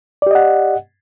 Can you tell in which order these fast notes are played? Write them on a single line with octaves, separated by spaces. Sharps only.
D5 G4 D#5 F#5